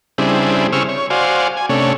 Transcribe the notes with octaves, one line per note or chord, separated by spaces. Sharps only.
C#3 G3 C4 D4 E4 G#4
C#3 C4 G#4 C#6 E6 F6
C#5
F#4 C5 D5 F5 G#5
G#5
C3 A3 C#4 D4 C#5